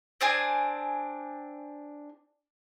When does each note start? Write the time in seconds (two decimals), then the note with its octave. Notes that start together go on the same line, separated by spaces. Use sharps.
0.21 C4 D4 G#4 G#5